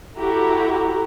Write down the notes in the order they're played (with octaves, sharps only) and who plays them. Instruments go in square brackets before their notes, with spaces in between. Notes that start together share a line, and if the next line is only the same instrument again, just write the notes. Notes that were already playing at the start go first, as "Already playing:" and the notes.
[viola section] E4 F#4 G4 A4 A#5